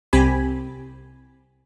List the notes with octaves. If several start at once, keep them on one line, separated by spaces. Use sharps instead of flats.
C2 C4 G4 G#5 B5